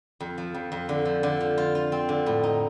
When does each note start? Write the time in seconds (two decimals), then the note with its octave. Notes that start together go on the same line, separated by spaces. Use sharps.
0.20 F2
0.38 F3
0.55 F2
0.72 F2
0.89 D3
1.05 F3
1.23 D3
1.40 F3
1.58 F4
1.75 F4
1.92 C4
2.09 D3
2.26 A2
2.43 D#4